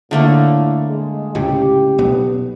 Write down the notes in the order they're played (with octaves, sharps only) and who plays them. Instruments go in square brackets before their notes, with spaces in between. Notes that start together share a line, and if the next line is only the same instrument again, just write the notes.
[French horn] A2 [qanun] D3 A3 A#3
[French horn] G#3
[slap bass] C#2 A2 C3 [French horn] G4
[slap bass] B1 B3